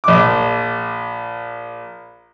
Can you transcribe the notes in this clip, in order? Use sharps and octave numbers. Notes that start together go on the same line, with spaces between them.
A#1 D6